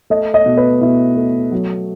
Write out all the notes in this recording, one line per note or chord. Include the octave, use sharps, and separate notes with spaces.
A3 D#5
D#5
B2
B4
B2 E4
A3
F#3